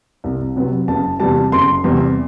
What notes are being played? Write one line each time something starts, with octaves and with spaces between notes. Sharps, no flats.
C2
C3 F#3 B3
F#1 A5
E2 C3 G3 A5
F#1 C6
E2 C3 G3